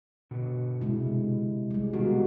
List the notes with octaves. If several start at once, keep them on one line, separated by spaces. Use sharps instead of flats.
B2 D3 F#4
C3 G#3 E4
G3 G#3
B2 D#3 A#3 F#4